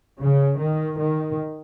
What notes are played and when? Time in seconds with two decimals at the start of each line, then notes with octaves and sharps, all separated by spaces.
0.19 C#3
0.58 D#3
0.98 D#3